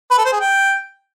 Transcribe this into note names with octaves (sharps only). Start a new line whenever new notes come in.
B4
A4
C5
G#4
G5